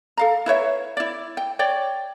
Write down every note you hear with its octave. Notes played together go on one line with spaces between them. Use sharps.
A4 F5 A#5
E4 B4 C#5 E5
E4 D5
G5
C#5 D5 G5